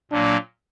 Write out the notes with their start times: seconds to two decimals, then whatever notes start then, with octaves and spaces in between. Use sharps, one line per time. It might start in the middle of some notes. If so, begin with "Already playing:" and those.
0.11 A#2 F#3 A#3 D4